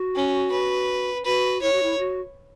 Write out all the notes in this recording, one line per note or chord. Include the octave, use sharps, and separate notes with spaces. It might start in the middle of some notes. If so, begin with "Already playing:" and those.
Already playing: F#4
C#4
B4
F#4 B4
E4 C#5
F#4
E4
F#4